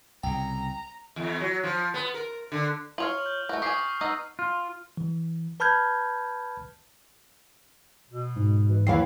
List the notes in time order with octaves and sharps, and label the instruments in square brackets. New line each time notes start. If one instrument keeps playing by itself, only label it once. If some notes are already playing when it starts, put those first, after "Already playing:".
[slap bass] C2 C#3 [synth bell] G5 [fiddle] A#5
[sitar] E2
F#3
F3
B3
A#4
D3
[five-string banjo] F4 C#5 F5 [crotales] F6 F7 F#7
[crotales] G6
[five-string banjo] A3 F#4
[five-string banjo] G4 G#5 [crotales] C#6 D#6 C7
[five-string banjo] B3 D#4 D#5 [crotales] E6
[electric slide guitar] F4
[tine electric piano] E3
B4 A5 B5 F6 G6 G#6
[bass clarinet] B2
[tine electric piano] G#2
[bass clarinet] E3
[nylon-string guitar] D#2 E3 F5 [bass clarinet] F#3 [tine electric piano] C7